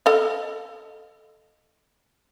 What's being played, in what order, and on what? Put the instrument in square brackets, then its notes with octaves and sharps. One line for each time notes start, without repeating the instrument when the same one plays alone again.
[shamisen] A4 D#5 F5